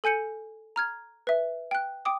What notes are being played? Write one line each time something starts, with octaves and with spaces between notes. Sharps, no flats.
A4 G#5 G6 C#7 D#7
A#5 F6 G#6
B4 E5
G5 F#6
G5 D6 D#6